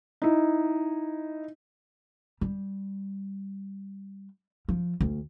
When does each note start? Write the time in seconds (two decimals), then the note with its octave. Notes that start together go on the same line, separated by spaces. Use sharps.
0.22 D#4 E4
2.41 G3
4.69 F3
5.01 D2